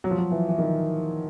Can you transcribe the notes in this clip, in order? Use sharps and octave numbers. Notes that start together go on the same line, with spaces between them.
F#3
F3
F#3
E3
E3
D#3